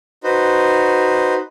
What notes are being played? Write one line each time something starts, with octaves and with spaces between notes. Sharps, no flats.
D#4 F#4 B4 C5